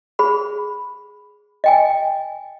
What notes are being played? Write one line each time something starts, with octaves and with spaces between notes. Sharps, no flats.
G#4 C5 B5
D#5 G5 G#5